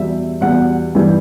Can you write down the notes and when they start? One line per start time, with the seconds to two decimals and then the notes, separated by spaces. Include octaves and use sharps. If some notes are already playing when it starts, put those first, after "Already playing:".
Already playing: E2 B2 G3 E5
0.41 E2 B2 G3 F#5
0.95 G2 E3 G3